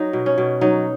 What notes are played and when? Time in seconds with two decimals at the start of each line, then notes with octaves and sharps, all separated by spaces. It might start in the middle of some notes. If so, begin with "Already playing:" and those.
Already playing: F#3 D#4
0.13 B2
0.26 C#4
0.38 B2
0.61 F#3 D#4